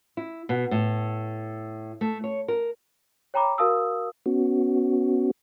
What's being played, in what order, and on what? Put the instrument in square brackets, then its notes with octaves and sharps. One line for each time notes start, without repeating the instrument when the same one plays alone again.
[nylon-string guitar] E4
B2
A2
A3
C#5
A#4
[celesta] C#5 G5 A#5 B5 D6
F#4 A#4 F5 A5 D#6 E6
[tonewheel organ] B3 C#4 F#4